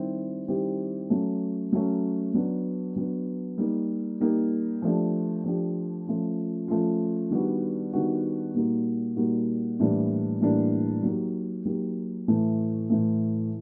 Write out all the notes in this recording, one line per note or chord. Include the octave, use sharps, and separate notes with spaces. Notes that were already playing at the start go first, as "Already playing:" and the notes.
Already playing: D#3 G3 C4 E4 G4
D#3 G3 C4 E4 G4
F#3 A3 C#4
F#3 A3 C#4
F#3 B3 D4
F#3 B3 D4
G3 A#3 D#4 G4
G3 A#3 D#4 G4
F3 A3 D4 G4
F3 A3 D4 G4
F3 A3 C#4 F4
F3 A3 C#4 F4
D#3 G3 B3 D4 F#4
D#3 G3 B3 D4 F#4
A#2 G3 A#3 D#4 F#4
A#2 G3 A#3 D#4 F#4
A2 E3 G3 A#3 D4
A2 E3 G3 A#3 D4
F#3 A#3 D#4 G4
F#3 A#3 D#4 G4
A2 E3 A3
A2 E3 A3